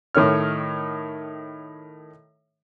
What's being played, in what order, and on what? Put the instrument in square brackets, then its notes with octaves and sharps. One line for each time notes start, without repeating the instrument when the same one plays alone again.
[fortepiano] A2 D#3 C#5 F6